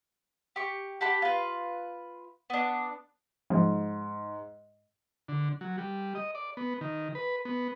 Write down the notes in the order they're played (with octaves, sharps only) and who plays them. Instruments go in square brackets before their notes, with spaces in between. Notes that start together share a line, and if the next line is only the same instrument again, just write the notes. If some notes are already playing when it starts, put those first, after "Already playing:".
[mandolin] G4 C#6
G4 F#5 A5 B5
F4 B4
B3 D4
[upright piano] G#2 [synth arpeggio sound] F3
[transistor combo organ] D3
F#3
G3
D#5
D5
B3
D#3
B4
B3